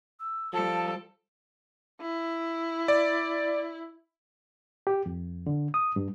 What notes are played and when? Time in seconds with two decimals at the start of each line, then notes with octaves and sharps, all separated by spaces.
0.20 E6
0.53 F3 G3 A4 A5
2.01 E4
2.88 D5
4.87 G4
5.06 F2
5.47 D3
5.74 D#6
5.96 G2